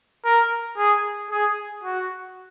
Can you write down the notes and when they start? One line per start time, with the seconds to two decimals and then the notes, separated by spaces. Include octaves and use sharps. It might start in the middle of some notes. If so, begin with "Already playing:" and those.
0.25 A#4
0.77 G#4
1.31 G#4
1.83 F#4